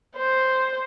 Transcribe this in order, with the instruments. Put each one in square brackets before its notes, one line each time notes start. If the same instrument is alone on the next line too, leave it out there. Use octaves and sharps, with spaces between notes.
[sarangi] C5